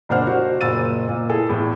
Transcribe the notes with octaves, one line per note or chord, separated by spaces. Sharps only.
F#1 A#2 D4 C5 F#5 F6
F#4 C5
F#1 A#2 E6 A6 D#7
A#2
E4 G#4 A4
E2 A2